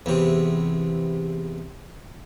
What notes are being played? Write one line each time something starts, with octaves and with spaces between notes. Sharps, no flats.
E2 C3